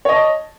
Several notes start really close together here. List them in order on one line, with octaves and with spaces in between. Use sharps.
C#5 D#5 A5